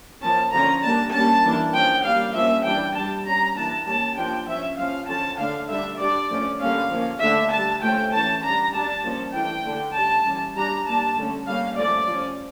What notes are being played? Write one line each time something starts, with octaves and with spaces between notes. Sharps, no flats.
F3 A#3 C#4 A5
D3 F3 C#4 A#5
G3 A#3 D4 A5
G3 A#3 C#4 A5
E3 A#3 D4
F3 C#4 G5
G3 A#3 D4 F5
F3 A#3 C#4 E5
E3 G3 D4 G5
G3 D4 A5
G3 C#4 A#5
E3 A#3 D4 A5
G3 A#3 C#4 A5
F3 A#3 D4 G5
F3 C#4 E5
F3 C#4 F5
D3 F3 C#4 A5
D3 A3 D4 F5
D3 G3 D4 E5
G3 D4 D5
F3 A3 C#4
D3 G3 A#3 C#4 F5
F3 A#3 C#4
D3 A3 D4 E5
G3 D4 A5
F3 A3 C#4 G5
E3 A3 C#4 A5
G3 D4 A#5
G3 D4 A5
F3 A#3 C#4
E3 A3 D4 G5
D3 A3 D4
G3 C#4 A5
E3 G3 C#4
G3 D4 A#5
G3 A#3 D4 A5
D3 A3 C#4
G3 A#3 C#4 F5
F3 A3 C#4 D5
F3 C#4